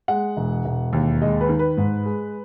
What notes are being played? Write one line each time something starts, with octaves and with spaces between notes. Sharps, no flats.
G#3 F#5
E1
E1
D#2
G#3 D#5
B4
D#3
B4
G#2
G#3